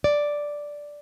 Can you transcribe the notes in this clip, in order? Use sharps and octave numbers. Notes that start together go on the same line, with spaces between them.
D5